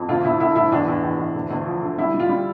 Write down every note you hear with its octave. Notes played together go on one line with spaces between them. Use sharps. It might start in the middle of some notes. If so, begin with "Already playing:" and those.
Already playing: F2
D2 F4
D2 E4
D3 E4
D2 E4
E2 D4
E2
E2
E2
D2
D2
F3
D3
G3 E4
G3
F4
G3